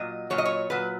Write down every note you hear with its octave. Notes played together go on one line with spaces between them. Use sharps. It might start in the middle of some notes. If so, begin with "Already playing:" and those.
Already playing: A#2 F#3 D#5
A#2 F#3 C#5
D#5
C#5
A#2 F#3 B4